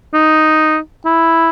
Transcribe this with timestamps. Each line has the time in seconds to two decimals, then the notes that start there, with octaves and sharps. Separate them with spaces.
0.14 D#4
1.05 E4